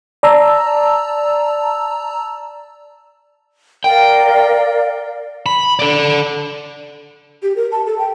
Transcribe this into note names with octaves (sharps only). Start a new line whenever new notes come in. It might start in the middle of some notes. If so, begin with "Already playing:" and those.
D5 A5 A#5 E6
A#4 D5 F5 G5
B5
A4 D5
G4
A#4
A5
A4
G5